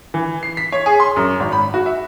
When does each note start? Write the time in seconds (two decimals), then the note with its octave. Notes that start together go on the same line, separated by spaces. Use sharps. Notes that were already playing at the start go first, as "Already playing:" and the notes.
0.14 E3
0.43 C7
0.57 B6
0.72 C#5
0.86 G#4
1.00 C6
1.16 F#2
1.40 G#1
1.52 B5
1.74 F#4
1.86 E5